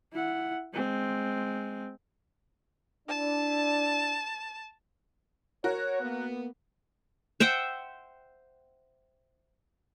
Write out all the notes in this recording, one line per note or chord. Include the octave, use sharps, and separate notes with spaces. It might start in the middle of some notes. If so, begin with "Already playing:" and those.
E4 F#5
G#3 C4
D4 E4 A5
F#4 A#4 C#5
A#3 B3
C5 E5 F#5 G5